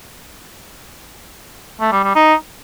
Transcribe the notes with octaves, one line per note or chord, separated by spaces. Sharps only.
A3
G3
G3
D#4